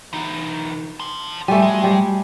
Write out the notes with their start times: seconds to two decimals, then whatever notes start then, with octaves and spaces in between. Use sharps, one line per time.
0.13 E3 D#4
1.00 A5 C6
1.48 D#3 G3 A3 G#5
1.62 G#3
1.84 G3